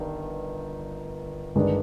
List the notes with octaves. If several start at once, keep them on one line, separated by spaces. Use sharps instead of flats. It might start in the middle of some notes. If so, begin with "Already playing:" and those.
Already playing: G1 G2 D#3
G1 G2 D#3 G#3 D4